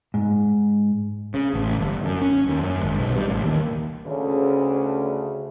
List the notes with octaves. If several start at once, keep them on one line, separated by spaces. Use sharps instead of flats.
G#2
C#3
A1
G1
F#2
C#4
D#2
F#2
G#1
B1
G2
A1
D#2
D2 C#3